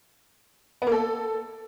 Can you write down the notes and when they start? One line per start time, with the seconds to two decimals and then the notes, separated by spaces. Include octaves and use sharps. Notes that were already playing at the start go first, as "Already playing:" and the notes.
0.82 B3
0.87 A#3
0.92 A4